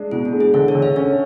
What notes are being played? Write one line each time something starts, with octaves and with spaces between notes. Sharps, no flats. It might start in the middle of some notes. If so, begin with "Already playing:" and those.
Already playing: G#3 D4
B2 E4
D4
G#3
G#4
D3 A4
C#5
D3
E5
C#4 C#5